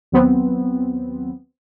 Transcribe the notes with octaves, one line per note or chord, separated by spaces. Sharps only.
D#2 F#3 B3 C4